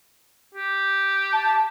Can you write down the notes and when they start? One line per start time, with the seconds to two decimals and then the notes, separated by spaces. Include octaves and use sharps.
0.55 G4
1.33 A5